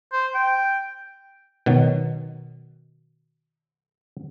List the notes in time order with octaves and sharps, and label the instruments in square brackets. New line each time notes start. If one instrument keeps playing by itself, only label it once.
[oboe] C5
G5
[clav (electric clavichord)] B2 D#3 F#3